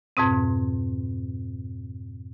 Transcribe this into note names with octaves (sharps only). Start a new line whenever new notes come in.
F2 G#2 B2 C4